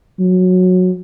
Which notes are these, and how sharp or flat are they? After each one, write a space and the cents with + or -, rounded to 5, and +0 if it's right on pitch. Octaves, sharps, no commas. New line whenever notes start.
F#3 -15